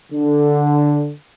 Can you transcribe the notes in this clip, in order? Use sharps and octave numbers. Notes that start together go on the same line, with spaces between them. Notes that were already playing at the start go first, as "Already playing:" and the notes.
D3